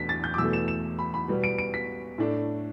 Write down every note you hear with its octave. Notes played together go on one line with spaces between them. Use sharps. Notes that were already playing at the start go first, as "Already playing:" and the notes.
Already playing: E2 B2 A3 D4 B6
A6
G6
D6
E2 B2 A3 E6
E7
E7
B5
B5
B2 G3 B3
D7
D7
B6
A2 A3 D4